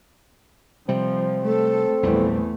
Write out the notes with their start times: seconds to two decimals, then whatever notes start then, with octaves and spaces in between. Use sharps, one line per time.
0.89 C3 F3 G3 C4
1.45 A3 A4
2.03 A#1 E2 A#2 G3 A3